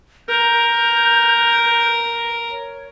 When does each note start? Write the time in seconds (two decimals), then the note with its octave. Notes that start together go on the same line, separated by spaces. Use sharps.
0.29 A#4 G6
2.51 C#5